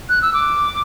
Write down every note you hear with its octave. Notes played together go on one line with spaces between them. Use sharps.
F#6
E6
D6